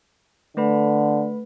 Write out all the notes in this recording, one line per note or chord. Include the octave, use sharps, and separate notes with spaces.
D3 A3 B4 B5